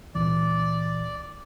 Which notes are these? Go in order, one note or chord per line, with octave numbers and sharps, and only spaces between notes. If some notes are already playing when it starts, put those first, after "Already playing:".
C#2 A#2 E3 D5